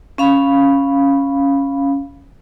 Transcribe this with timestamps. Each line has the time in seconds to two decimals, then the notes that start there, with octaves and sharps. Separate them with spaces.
0.18 C#4 F5 B5